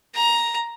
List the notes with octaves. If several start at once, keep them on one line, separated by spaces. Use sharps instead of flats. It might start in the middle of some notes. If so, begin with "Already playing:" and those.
A#5